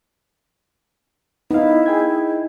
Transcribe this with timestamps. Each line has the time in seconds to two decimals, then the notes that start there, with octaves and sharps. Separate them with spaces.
1.51 B3 D#4 E4 F5
1.86 G#4 G5 G#6